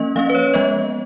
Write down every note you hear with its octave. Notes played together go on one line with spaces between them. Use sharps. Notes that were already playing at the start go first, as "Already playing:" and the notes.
Already playing: F3 A#3 C#4 D#5
F3 A#3 C#4 F5
B4
C#5
F3 G#3 B3 D#5